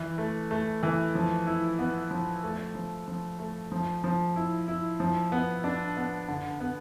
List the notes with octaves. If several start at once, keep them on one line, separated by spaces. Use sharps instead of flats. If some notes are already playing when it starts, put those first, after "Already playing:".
Already playing: E3
A3
A3
E3
F3
E4
B3
F3
A3
F3
F3
A3
F3
F3
E4
E4
F3
B3
D4
B3
D3
B3